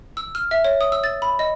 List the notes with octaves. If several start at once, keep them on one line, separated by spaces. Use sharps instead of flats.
E6
F6
E5
C#5
D#6
E6
A6
B5
D#5